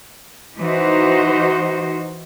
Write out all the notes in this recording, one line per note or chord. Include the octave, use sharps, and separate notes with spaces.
E3 D#4 F#4 C5